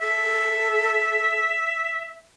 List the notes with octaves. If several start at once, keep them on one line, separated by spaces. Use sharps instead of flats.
A4 E5